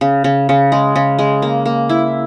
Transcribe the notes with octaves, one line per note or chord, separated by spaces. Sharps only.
C#3
C#3
C#3
G#3
C#3
G#3
A#3
A#3
E4